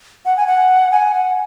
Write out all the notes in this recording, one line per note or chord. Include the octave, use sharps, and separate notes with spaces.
F#5
G#5
F#5
G#5
F#5